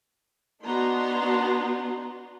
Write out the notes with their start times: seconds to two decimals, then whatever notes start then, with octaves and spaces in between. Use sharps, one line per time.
0.64 B3 D4 D#4 F#4 A#5 C6